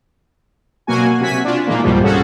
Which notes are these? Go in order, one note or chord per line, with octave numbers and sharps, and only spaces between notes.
B2 F#3 A#3 F#4 G#5
C3 F#4 G#5 B6
D4 F4
A#2 D#3 E3 G#3 A#3
C2 F2 G#2 B2 F3 G3
C#4 F#4 G#4 A4